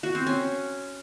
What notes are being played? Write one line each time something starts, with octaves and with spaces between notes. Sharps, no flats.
F#4
C4
C#4